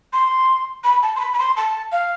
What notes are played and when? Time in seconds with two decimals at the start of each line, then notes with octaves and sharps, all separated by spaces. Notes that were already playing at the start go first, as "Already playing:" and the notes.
0.13 C6
0.84 B5
1.02 A5
1.16 C6
1.19 B5
1.33 B5
1.39 C6
1.56 A5
1.92 F5